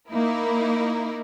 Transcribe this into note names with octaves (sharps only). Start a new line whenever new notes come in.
A#3 D#4 E4 A#4